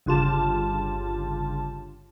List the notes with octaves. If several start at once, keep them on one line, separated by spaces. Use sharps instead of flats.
G1 G2 C#3 F4 G4 A5